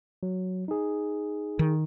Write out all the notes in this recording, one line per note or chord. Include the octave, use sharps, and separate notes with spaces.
F#3
D#4 G#4
D#3